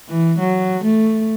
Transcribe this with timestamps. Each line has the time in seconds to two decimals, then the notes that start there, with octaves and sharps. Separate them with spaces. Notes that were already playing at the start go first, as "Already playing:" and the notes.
0.09 E3
0.39 F#3
0.84 A3